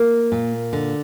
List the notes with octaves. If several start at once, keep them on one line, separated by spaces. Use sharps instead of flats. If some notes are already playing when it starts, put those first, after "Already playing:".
Already playing: A#3
A#2
D3